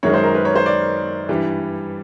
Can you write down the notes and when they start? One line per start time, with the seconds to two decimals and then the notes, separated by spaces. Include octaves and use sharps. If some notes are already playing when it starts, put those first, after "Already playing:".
0.03 F#2 D#3 G#3 C#5
0.14 C5
0.24 A#4
0.35 B4
0.45 C#5
0.56 C5
0.66 D5
1.29 G2 E3 G3